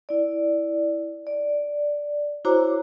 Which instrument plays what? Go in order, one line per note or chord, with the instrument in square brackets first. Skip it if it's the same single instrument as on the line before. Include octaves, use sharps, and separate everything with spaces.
[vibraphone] E4 D5
D5
E4 F#4 C5 C#5 A#5 D6